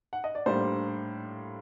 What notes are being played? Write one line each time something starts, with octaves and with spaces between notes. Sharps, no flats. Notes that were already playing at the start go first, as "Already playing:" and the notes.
F#5
D#5
D5
A2 G3 A#3 D4 C5